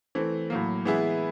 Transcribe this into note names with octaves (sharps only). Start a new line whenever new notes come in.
E3 A3 C4
A2 F#3 A#3
E3 G#3 B3 E4 G#4